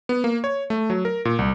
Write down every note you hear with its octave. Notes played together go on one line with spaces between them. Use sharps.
B3
A#3
C#5
A3
F#3
A#4
A#2
C2